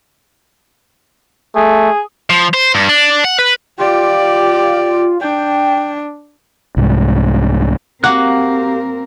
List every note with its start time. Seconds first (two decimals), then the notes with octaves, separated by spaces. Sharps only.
1.56 A3 G#4
2.30 F3
2.54 C5
2.75 G2
2.89 D4
3.25 F#5
3.39 B4
3.78 F4 G4 D5
5.21 D4 G5
6.77 C2 G#2
8.04 A#3 C4 F#4 G4 A#4 F5 F#5 F#6